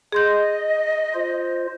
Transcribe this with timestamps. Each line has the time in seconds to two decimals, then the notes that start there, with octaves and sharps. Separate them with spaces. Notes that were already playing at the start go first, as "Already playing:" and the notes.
0.12 G#4 D#5 C6 G6
1.14 F4 C5